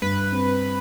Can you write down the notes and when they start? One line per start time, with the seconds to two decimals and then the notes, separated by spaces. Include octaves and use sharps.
0.02 G2 B4
0.32 C4